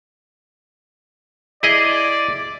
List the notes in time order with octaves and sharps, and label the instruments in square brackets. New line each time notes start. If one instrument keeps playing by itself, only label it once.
[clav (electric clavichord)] E4 G#4 D#5 [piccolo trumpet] D5